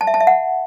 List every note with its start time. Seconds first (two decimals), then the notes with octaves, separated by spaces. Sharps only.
0.01 A5
0.07 E5
0.14 A5
0.21 E5
0.27 F#5